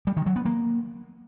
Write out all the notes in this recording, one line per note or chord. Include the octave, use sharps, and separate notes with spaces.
G3
D#3
F#3
B3
A#3